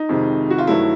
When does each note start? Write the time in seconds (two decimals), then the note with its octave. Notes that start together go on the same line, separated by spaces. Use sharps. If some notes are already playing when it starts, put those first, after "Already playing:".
Already playing: D#4
0.09 F2 C3 D#3 G#3
0.50 F#4
0.58 F4
0.67 G2 D#3 F#3 A3 E4